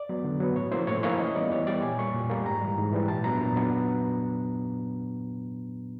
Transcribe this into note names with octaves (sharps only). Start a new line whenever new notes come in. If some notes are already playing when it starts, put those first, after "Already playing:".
Already playing: D5
F#3 B3
D3
F#3 B3
A2 C#5
F3 A#3 C#4 E4 C5
A2 C#5
F3 A#3 C#4 E4 C#5
E3 D#5
G3 B3 D5
E3 C#5
G3 B3 D5
A#2 G#5
G3 A#3 C#6
A#2
G3 A#3
G#2 A#5
E3 G3
G#2
E3 G3
A#2 A5
F#3 B3 D4 A#5
A#2
F#3 B3 D4